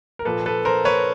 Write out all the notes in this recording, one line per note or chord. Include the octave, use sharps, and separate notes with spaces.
A#4
A#2 F3 A4 B4
A4 B4
A#4 C5
B4 C#5